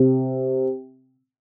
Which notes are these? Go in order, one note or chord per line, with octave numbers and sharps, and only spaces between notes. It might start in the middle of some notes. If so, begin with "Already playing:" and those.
Already playing: C3